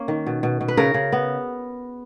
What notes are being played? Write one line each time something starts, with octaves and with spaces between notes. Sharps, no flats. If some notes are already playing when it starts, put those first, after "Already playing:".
Already playing: A#3 C#4
D#3
B2
B2
B2
B4
C#3 A#4
C#3
B3